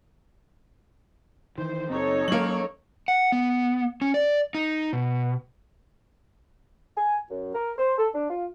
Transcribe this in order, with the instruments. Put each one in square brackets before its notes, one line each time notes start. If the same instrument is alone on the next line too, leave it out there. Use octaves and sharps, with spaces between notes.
[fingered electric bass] D#3 E3 [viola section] C5
[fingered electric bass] F#1 C4 [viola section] D#4 A4 C#5
[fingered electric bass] F#3 [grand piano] A#3 C#4 F#7
[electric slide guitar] F#5
B3
C#4
D5
D#4
B2
[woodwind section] G#5
F#2
A#4
C5
A4
D4
F4